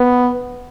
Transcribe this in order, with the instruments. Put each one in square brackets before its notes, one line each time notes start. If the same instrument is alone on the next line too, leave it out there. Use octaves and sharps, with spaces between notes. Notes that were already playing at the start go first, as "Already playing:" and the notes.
Already playing: [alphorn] B3